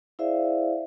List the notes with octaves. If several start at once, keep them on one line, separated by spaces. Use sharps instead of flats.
E4 G#4 C5 D5 E5 F5